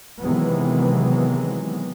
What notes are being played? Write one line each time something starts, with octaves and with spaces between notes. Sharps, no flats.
C3 D#3 E3 F#3 G#3 B3